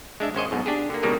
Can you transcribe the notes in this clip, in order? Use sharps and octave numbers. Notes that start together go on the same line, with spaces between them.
G#3 D4 E5
G#1 C#4 C5 D#5
B1 G#2 B2
D4 G4 G#4
D3 A#3
C#2 B2 D#3 G3 G#3 A#3